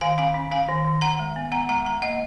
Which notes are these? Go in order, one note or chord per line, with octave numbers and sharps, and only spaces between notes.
D#3 F5 G#5
C#4 F5 G#5
C#4
C#4 F5 G#5
D#3
D#3
D#3 F#5 A#5
G#3
B3
B3 F#5 A#5
G#3 F#5 A#5
G#3 F#5 A#5
A#3 D#5 F#5